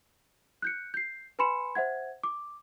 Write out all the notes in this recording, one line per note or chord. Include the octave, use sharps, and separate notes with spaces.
F#6 G6 C#7
G6 C7
B4 G#5 B5 C6 C#7 E7
C5 E5 F#5 G#6
D6